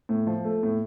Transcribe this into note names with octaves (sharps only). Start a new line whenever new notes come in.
A2
F3
A3
A2